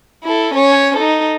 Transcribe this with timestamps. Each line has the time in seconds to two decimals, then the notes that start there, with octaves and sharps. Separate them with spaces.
0.24 E4 A4
0.54 C#4 C#5
0.97 D#4 A4